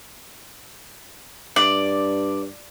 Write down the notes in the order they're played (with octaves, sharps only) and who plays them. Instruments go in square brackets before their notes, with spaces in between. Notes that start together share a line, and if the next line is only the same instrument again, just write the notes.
[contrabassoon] G2 [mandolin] D5